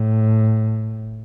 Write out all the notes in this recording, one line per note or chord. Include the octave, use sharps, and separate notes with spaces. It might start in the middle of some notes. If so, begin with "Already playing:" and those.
Already playing: A2